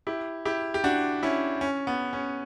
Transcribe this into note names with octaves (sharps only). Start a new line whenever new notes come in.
E4 G4
E4 G4
G4
D4 F#4
C#4 E4
C#4
B3
C#4